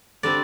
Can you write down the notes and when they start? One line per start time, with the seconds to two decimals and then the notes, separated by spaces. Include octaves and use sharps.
0.23 D3 G3 C4 D5